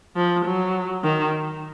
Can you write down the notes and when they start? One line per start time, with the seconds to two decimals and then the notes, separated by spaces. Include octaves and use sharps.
0.16 F3
0.45 F#3
1.04 D#3